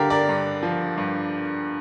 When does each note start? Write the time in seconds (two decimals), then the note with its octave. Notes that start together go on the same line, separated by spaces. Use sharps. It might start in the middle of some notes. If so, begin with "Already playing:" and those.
Already playing: G2 D3 G4 A#4 D5 F5
0.10 A#4 D5
0.29 G2
0.63 F3
0.98 G2